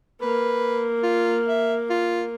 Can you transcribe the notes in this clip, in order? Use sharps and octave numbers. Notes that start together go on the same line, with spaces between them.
A#3 B4
F4
E5
F4